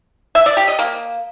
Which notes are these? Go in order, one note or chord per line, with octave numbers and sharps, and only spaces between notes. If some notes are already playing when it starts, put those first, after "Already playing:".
E5
D5
G4
D#5
A#3